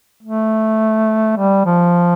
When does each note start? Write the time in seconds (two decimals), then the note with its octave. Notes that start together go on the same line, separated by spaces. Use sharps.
0.22 A3
1.37 G3
1.65 F3